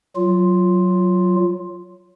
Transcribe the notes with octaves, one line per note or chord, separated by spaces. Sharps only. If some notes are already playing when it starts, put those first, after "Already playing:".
F#3 F4